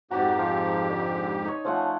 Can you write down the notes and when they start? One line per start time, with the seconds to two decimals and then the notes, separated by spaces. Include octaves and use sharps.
0.11 F2 G#2 F#4 G4 D5 G5 A#5
0.39 F3
0.90 D3
1.45 D#4 C#5
1.65 F3 A3 C#4 F#5